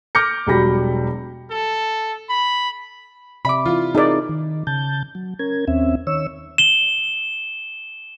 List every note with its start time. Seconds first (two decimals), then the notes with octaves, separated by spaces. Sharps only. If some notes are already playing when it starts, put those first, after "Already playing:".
0.15 D6 F6 G6 A#6 C#7
0.47 E1 F#3 G3 B5 A#6
1.50 A4
2.29 B5
3.45 C3 D5 E5 B5 D6
3.66 E3 E4 F4
3.95 C4 D#4 G#4 A#4 D5
4.29 D#3
4.67 C#3 A5 G6
5.15 F#3
5.39 C#4 A#4 G#6
5.68 D#2 C4 C#4 E5
6.07 D#3 C#5 E6
6.58 E7 G7